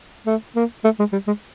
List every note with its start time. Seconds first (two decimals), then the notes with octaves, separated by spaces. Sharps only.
0.27 A3
0.56 A#3
0.84 A3
0.99 G#3
1.12 G3
1.27 G#3